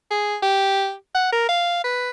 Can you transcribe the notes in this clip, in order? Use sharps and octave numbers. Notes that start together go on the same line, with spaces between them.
G#4
G4
F#5
A#4
F5
B4